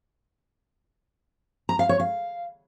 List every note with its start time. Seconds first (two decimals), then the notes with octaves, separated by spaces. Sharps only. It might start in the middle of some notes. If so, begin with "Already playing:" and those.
1.69 A#5
1.79 F5
1.89 C#5
2.00 F5